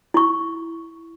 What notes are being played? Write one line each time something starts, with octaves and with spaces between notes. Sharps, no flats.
E4 C#6